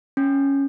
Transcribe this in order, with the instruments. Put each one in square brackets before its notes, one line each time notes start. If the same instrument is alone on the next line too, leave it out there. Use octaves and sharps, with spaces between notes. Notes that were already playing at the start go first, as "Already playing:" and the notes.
[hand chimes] C#4